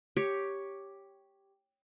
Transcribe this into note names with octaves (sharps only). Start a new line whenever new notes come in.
G4 C#5